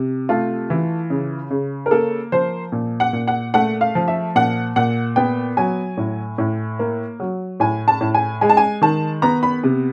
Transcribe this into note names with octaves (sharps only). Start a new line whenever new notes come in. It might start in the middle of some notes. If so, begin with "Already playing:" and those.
Already playing: C3
A3 F4
E3
C#3
C#3
A#4
A#3 A4
F3 C5
A#2
F#5
A#2
F#5
A3 F#5
F5
F3
E5
A#2 F#5
A#2 F#5
B3 G5
F#3 G#5
A2
A2
A#3
F#3
A2 G#5
A5
A2
G#5
G#3 G#5
A5
G#5
D#3 A5
B3 A#5
B5
C3